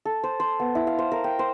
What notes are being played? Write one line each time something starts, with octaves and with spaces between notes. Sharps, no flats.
A4
C5
C5
B3
E4
F5
C5
A#4
G5
C5